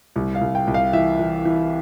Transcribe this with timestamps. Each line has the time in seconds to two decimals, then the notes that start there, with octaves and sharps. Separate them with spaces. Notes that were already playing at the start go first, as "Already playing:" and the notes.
0.16 C2
0.35 F5
0.41 C2
0.55 G5
0.67 C2
0.74 F5
0.93 E3 E5
1.19 E3
1.45 E3